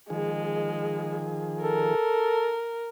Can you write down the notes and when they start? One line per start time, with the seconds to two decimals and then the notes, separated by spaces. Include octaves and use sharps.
0.10 D#3 F3 G#3 G#4
1.62 A4 A#4